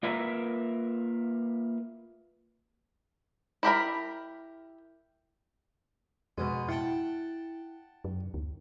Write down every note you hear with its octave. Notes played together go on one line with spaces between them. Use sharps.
A#3 F4 A#4 B4 E5 A#5
E4 G4 A#4 B5
F2 B2 G#3
E4 F#5 G5 A5
F#2
D2